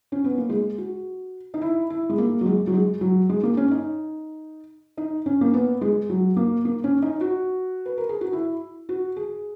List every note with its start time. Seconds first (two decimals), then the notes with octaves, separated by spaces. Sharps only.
0.12 C#4
0.24 B3
0.38 A#3
0.49 G#3
0.78 F#4
1.54 D#4
1.61 E4
1.90 E4
2.10 G#3
2.18 A#3
2.41 F#3
2.46 G#3
2.67 F#3
2.74 G#3
3.01 F#3
3.30 G#3
3.43 A#3
3.57 C#4
3.71 D#4
4.97 D#4
5.26 C#4
5.41 A#3
5.53 B3
5.81 G#3
6.10 F#3
6.37 A#3
6.65 A#3
6.84 C#4
7.02 D#4
7.21 F#4
7.86 B4
7.98 A#4
8.09 G#4
8.21 F#4
8.33 E4
8.89 F#4
9.16 G#4